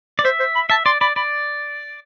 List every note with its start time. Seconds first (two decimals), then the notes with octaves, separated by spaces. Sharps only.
0.19 D5
0.24 C5 E5
0.39 C5
0.55 B5
0.70 E5 A5
0.86 D5 C6
1.01 D5 B5
1.16 D5 B5